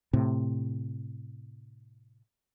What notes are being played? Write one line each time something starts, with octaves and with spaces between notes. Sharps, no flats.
A2 C3